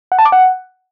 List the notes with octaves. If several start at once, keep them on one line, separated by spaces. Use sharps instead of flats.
F#5
A5
D6
F#5